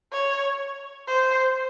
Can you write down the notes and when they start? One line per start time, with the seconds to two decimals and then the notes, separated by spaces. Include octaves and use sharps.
0.12 C#5
1.07 C5